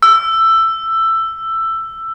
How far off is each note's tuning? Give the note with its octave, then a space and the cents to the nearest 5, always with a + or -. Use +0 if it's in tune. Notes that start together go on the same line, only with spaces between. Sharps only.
E6 +10